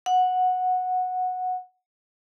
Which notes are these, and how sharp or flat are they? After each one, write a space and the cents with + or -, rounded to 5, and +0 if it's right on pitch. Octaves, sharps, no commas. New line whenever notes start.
F#5 -10